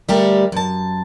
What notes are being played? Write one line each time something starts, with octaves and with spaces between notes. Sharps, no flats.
D3 G3 A3 G4 A#4
F#2 A5